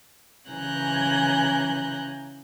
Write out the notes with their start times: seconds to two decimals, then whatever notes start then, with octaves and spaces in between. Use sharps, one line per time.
0.49 C#3 E3 G#5 A#5 F#6 G6